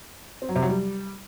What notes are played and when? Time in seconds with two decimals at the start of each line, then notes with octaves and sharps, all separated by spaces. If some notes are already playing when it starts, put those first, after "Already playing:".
0.42 C4
0.49 F#3
0.56 C3
0.62 F#3
0.69 G3